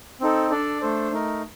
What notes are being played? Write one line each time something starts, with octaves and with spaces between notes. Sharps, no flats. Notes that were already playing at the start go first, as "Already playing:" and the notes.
C4 D#4 A4
D4 A4 D5
A3 D4 A4 C5
A3 D#4 A#4